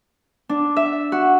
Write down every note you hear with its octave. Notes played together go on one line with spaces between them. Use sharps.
D4
E5
F#4